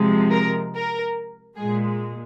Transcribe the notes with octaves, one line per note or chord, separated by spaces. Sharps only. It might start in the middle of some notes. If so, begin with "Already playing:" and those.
Already playing: C3 F3 G#3
A#4
A#4
A#2 G#3 G#4